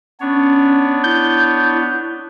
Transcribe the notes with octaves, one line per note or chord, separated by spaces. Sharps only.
B3 C#4 D4 C#5
E4 G6